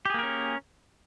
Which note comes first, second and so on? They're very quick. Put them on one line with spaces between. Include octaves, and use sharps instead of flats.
G4 G#4 A#3 A#4 C#4